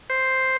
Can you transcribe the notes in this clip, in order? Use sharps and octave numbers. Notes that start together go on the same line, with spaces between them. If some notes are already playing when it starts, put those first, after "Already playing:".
C5